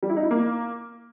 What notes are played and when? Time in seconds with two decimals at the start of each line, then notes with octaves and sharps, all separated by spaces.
0.03 G3
0.10 E4
0.17 D#4
0.24 E4
0.31 A#3